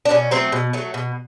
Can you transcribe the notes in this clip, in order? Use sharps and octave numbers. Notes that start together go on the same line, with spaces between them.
D4
B2 C#4
F#3 A3 C4
B2
F#3 A3
B2